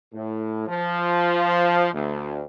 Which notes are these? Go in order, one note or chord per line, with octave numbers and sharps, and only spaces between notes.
A2
F3
D2